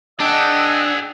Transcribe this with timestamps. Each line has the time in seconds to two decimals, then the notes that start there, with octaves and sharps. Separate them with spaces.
0.20 D4 G#4 D#5 F#5 G5 E6 F#6